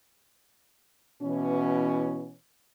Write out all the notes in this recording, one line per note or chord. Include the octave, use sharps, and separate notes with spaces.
B2 E3 C#4